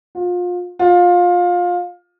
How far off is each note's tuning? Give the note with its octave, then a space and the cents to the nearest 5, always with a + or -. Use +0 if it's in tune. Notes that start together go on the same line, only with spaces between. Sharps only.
F4 +30
F4 +20